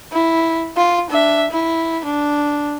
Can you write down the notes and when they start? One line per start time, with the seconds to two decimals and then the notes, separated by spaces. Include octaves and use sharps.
0.12 E4
0.77 F4
1.10 D4 E5
1.51 E4
2.05 D4